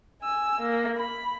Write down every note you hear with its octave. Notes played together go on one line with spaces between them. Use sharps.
G#5 E6
A#3
B5